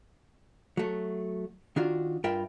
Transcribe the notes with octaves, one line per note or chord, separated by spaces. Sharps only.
F#3 A3
D#3 D4 F4 F#4
G2 F4 A#4 E5 G5 B5